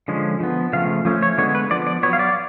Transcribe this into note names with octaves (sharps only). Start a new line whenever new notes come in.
D3 F3 G#3 C#4
F3 B3
C#3 F3 A3 F5
F3 A3 C#4
C#5
D3 G#3 B3 C#5
B4
F3 B3 D5
D5
F#3 B3 C#5
F5
D5